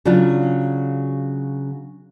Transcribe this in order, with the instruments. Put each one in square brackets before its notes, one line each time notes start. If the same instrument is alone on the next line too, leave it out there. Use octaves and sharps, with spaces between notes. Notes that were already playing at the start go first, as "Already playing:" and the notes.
[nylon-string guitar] C#3 F#3 D4 F4